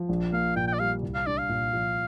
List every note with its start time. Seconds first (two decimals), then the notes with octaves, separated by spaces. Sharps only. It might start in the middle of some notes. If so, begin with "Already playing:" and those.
Already playing: F3
0.09 A#1
0.33 A#3 F5
0.56 A#2 G5
0.67 G5
0.73 D5
0.79 G3 F5
1.03 C2
1.14 F5
1.26 D4 D5
1.38 F5
1.49 A#2
1.73 F3